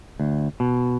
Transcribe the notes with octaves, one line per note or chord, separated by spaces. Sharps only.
D2
B2